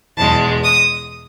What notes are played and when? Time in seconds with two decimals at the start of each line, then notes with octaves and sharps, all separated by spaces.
0.17 E2 B2 G#3 A5
0.64 D#6